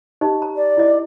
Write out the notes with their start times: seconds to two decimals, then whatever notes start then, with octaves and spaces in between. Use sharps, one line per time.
0.21 D#4 G4 D#5
0.42 A#5
0.56 D5
0.77 E4 D#5